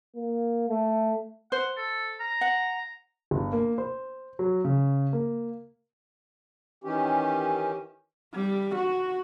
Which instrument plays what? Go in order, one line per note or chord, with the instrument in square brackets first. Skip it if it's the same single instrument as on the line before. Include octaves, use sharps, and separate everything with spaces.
[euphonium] A#3
A3
[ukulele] C5 [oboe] F#5
[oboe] A4
A#5
[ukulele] F#5
[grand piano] G1
A#3
C5
F#3
C#3
A#3
[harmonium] D#3 E3 C#4 G4
[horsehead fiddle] G3
F#4